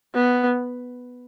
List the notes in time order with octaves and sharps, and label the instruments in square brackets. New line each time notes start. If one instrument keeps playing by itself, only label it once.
[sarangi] B3